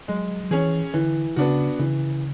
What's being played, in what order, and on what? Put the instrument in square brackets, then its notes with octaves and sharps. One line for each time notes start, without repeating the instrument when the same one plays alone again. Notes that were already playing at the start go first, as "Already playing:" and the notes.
[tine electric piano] F#3 [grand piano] G#3
[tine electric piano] F#3
[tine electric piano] E3 [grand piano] C#4 G#4
[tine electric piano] D3 [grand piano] E3
[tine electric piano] C#3 [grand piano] B3 D4 F#4
[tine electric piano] C#3 [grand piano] E3